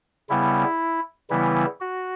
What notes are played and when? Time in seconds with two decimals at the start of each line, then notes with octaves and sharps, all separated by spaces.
0.29 C#3 G3 B3 E4
1.30 C#3 E3 G3 B3 E4
1.81 F#4